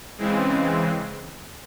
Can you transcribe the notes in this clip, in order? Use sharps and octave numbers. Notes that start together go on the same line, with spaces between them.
C#3 E3 G#3 C4